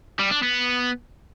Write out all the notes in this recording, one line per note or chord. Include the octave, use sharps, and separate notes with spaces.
G3
D4
B3